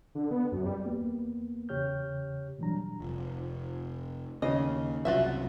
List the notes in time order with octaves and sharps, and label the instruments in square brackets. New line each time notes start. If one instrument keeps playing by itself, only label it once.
[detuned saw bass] D3
B3
F#2
G3
[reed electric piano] E2 A#3 B3
E2 C#3 G4 C#5 F6 G6
A#2 E3 F#3 G3 D4 A#5
[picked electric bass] F1
[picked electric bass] D#2 [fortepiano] C#3 [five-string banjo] D#5
[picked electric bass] C2 F#2 [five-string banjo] F4 F#4 E5